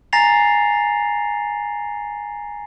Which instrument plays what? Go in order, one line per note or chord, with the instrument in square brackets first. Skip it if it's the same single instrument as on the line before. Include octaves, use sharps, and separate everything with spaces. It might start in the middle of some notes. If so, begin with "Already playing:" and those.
[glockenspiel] G#5 A#5 A6 A#6 C7 F7